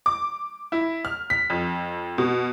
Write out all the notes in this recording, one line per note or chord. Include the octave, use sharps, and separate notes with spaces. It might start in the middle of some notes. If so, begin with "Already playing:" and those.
D6
E4
F6
B6
F2
B2